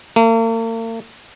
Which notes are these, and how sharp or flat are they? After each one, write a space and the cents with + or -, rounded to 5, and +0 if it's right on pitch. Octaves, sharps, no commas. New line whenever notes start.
A#3 -45